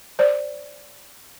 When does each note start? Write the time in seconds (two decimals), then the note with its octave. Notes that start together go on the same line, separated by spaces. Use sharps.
0.19 C5 D5